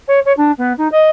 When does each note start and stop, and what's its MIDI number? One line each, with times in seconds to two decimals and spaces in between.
0.08 0.19 73
0.26 0.33 73
0.37 0.52 62
0.58 0.73 59
0.78 0.88 63
0.92 1.10 75